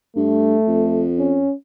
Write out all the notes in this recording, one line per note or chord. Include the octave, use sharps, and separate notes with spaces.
G2 A3
F2
C#4